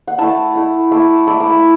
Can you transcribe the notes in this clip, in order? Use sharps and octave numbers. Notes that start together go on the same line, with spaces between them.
F#5
A3 E4 A5
A3 E4
A3 E4 D6
A3 E4 D6
D6
B5